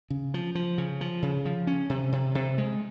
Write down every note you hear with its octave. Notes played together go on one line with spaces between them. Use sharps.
C#3
F3
F3
C#3
F3
C#3
F3
C#4
C3
C3
C3
G#3